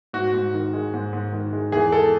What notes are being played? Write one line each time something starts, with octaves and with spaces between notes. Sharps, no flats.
G#2 F#4
G#2
D#3
G#3
G#2
G#2
D#3
G#3
E2 G#4
G#3 A4